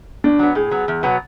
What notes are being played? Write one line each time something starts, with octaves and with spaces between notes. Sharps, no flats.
A2 D4
F#3 B3
A2 G#4
F#3 B3
E2
B2 F#3 B3